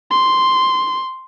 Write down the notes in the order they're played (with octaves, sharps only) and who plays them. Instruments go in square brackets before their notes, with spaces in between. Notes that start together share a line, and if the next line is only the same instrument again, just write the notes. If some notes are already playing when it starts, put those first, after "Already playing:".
[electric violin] C6